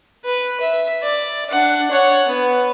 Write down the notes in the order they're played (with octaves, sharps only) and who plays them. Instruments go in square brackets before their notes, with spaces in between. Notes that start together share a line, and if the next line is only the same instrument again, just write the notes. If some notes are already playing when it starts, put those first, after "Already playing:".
[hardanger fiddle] B4
E5
D5
D4 F#5
C#5 F#5
B3